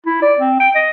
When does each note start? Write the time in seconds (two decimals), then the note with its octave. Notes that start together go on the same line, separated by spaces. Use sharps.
0.06 E4
0.22 D5
0.38 C4
0.60 G5
0.75 D#5